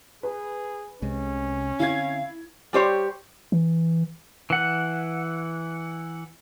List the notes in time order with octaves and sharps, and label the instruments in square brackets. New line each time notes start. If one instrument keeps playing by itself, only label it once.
[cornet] G#4 [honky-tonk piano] B4
[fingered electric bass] C2 C3 G#3 [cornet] C#4
[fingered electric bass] D3 C4 [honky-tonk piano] E4 G#6 [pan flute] F5
[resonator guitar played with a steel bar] G3 G4 C5 C#5
[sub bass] E3
[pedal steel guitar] E3 F#5